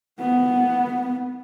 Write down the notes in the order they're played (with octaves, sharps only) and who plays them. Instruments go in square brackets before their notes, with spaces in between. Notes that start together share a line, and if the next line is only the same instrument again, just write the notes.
[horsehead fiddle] B3